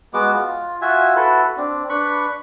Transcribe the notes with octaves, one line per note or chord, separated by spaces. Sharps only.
G#3 B3 F#4 D6
F4
F4 F#4 E5 G#5
E4 F#4 A4 B4
C4 D4
D4 B4 B5 C#6